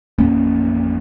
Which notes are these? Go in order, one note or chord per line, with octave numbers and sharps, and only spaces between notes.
A1 F2 A#3 C#4